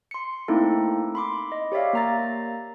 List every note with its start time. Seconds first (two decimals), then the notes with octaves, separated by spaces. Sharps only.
0.11 C6 C#7
0.48 A3 A#3 C4 D#4 E4 A4
1.15 B5 C6 D6
1.52 D#5
1.72 G4 C#5 D5 E5 F5
1.93 A#3 A#5 A6